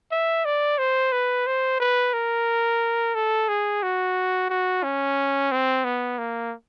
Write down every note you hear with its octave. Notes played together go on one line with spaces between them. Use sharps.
E5
D5
C5
B4
C5
B4
A#4
A4
G#4
F#4
F#4
C#4
C4
B3
A#3